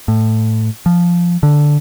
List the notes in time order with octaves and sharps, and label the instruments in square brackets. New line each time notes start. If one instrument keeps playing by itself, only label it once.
[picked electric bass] A2
F3
D3